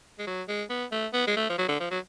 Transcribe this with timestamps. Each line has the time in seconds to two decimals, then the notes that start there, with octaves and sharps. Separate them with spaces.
0.19 G#3
0.27 F#3
0.48 G#3
0.70 B3
0.92 A3
1.14 B3
1.27 G#3
1.36 A3
1.50 F3
1.58 F#3
1.69 D3
1.80 F3
1.91 F#3